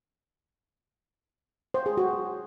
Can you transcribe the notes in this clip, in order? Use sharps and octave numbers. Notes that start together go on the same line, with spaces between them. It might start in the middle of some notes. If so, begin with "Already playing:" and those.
C5
G#4
F#4